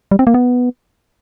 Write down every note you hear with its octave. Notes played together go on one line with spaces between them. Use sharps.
G3
C4
A#3
B3